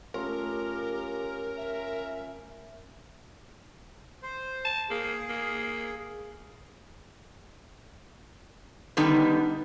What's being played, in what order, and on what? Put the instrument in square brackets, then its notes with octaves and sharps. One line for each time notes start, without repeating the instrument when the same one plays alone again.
[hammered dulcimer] A3 C#4 F4 [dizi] G4 [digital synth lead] A#4
[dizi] E5
[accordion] C5
[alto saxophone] A5
[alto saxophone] A#3 [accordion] G#4
[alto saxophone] A#3
[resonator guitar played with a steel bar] D3 D#3 G3 B3 D#4